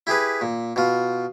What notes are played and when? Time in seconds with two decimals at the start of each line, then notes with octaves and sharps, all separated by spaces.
0.07 E4 G4 G#4 B4
0.41 A#2
0.76 B2 F4